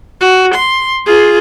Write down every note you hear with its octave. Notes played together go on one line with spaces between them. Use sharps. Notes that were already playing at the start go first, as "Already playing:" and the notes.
F#4
C6
F4 G#4